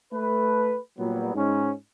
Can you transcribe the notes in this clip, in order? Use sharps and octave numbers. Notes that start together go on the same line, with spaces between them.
A3 B4
A#2 F#3 G3 B3
G#2 C#4